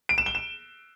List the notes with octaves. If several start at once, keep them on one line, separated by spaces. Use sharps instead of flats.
D7
E7
G7
E7